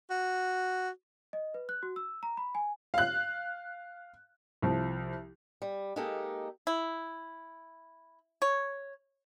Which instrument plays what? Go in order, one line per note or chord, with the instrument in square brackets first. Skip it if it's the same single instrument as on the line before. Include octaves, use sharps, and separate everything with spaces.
[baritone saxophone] F#4
[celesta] D#5
B4
F#6
F#4
E6
A#5
B5
G#5
[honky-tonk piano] F5 F#6
[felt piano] C2 F3
[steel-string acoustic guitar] G3
G#3 A#3 D#4 G4 A4
[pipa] E4
C#5